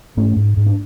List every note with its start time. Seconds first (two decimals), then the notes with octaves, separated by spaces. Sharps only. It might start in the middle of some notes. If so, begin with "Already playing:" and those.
0.17 G#2 A3 C#4
0.37 G#2
0.57 G#2
0.67 D4